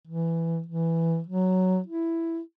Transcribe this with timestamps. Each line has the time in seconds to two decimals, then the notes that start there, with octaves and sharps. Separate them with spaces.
0.07 E3
0.67 E3
1.26 F#3
1.87 E4